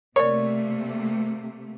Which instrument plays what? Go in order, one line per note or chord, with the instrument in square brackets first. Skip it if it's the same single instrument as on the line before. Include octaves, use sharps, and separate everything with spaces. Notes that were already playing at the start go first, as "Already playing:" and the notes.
[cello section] C3 A3 A#3 [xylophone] A#4 D5 [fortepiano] C#5